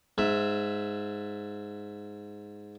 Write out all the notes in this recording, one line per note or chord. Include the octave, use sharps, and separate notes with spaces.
G#2 E5